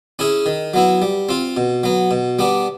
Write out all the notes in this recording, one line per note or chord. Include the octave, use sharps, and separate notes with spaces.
C#4 E4 G#4
D#3
F#3 B3 E4
G3
C4 F4
B2
F#3 B3
B2
G3 B3 D4